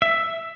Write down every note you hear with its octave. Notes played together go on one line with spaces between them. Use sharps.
E5